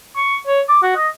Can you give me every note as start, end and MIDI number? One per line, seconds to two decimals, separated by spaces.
0.16 0.37 85
0.47 0.61 73
0.69 0.78 86
0.82 0.91 66
0.96 1.08 75